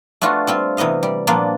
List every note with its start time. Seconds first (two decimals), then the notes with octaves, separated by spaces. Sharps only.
0.21 A3 B3 D4 F4 F#4
0.47 G3 C4 F4
0.77 C3 E3 B3 D#5 F5
1.03 G3
1.27 A#2 F3 G3 A#3 B3 D4